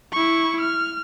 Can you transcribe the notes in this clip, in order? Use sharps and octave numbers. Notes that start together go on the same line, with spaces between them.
E4 C#6
F6